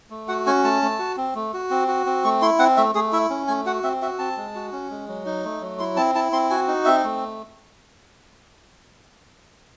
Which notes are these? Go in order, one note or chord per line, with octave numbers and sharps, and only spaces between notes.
A3
F#4 F#5
C#4 G#5
A3 A5
A3
F#4
C4
A3
F#4
C4
F#4
C4
A3 C#6
E4 C6
C4 F#5
A3 E5
A3 G#4
E4 E5
C#4
A3 G#5
F#4 F#5
C4 E5
F#4 E5
C4 A5
G#3
F#4
C#4
G#3
F#3
D#4
A3
F#3
E4 C6
C4 A5
E4 A5
C4 C6
F#4 G#5
D#4
C4 E5
A3